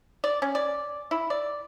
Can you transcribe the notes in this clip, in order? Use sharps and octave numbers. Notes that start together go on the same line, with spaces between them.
D5
C#4
D5
E4
D5